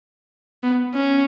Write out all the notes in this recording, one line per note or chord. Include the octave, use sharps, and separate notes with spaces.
B3
C#4